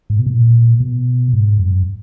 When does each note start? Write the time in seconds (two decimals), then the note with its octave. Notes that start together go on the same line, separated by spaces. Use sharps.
0.10 G#2
0.19 B2
0.26 A#2
0.80 B2
1.33 G#2
1.59 F#2